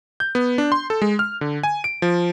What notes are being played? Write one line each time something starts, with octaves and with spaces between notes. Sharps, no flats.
G6
B3
D4
C6
A4
G#3
F6
D3
G#5
D7
F3